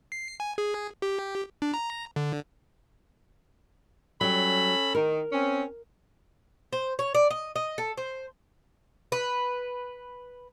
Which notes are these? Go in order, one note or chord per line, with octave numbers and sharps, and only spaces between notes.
C7
G#5
G#4
G4
D4
A#5
D3
F#3 G3 C#4 A4 B5
D#3 A#4
C4 C#4
C5
C#5
D5
D#5
D#5
A4
C5
B4